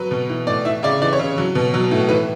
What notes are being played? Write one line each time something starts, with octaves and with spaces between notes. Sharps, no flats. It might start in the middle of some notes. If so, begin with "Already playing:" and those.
Already playing: F#3 B4
B2
E3
A2 D5
E3 E5
C#3 D5
E3 D5
C#5
C#3
F#3
B2
F#3
A2
E3 B4